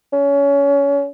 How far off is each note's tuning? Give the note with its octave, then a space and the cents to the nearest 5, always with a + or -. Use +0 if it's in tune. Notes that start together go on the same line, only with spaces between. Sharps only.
C#4 +25